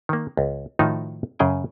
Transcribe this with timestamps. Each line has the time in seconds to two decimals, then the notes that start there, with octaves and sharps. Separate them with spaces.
0.09 D#3 A#3
0.37 C#2
0.79 A2 D#3 F3 D#4 F4 F#4
1.39 F#2 C#3 G#4 G5 G#5